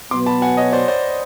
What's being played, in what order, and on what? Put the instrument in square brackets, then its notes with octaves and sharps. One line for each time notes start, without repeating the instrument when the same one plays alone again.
[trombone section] B2 F#3 B3 [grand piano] C6 D6
[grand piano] A5 B5
F#5 G#5
C#5 D#5
C5 D5
C5 D5